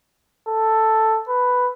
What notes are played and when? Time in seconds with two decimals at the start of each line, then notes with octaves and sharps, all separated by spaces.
0.48 A4
1.29 B4